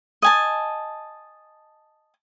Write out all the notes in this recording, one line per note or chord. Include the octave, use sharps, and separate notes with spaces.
D#5 G#5 A5